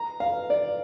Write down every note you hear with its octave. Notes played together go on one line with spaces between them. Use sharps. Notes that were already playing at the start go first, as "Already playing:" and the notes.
Already playing: A#5
F5
D5